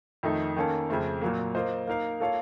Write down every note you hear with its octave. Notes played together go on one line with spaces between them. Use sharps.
F2 D#3 A3 D#4
D#3 A#3 C#4 A4
F2 C#3 A3 C4
A#2 F#3 A#3
A#3 F4 C5 D#5
A#3 D#4 A#4 F5
A#3 F4 A4 C#5 F5